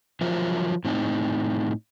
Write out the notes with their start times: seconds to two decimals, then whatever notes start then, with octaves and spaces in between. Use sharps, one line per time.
0.21 F3 F#3 F4 A#4 C5 E5
0.85 A2 C4 D#4